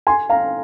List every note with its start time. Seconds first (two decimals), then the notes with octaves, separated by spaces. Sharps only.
0.07 G#5 C6
0.30 F5 A#5